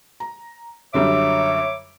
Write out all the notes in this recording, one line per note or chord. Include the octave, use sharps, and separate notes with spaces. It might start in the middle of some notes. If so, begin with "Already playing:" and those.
A#5
F#2 D3 G3 C#5 E5 D6